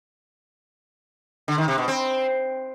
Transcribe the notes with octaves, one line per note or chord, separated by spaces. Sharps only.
D3
D#3
C3
B2
C4